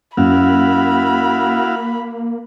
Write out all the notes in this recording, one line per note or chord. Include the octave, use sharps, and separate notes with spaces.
F#2 A#3 E4 F#4 F5 B5